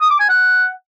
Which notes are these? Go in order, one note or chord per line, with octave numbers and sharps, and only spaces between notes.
D#6
D6
G#5
F#5